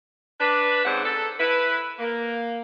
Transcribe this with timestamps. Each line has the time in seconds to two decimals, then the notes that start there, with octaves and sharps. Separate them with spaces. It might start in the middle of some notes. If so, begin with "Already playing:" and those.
0.40 D4 B4
0.85 G#2 C#3 G3 C4 F#5
1.04 A4
1.39 E4 B4
1.99 A#3